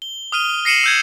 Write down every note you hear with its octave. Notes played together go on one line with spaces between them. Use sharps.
G7
D#6 F6 D#7 G7
A#6 C7 C#7 D#7 E7 F#7
E6 G6 G#6